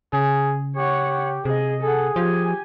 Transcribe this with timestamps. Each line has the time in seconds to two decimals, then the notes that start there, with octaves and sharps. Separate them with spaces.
0.13 C#3 G#4
0.77 G4 C#5 F#5
1.45 C3 G#4 D#5
1.83 G#4 A4 F#5
2.16 F3 G4 G#5